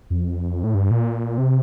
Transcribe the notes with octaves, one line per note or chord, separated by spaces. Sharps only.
F2
A2
G2
A#2
C3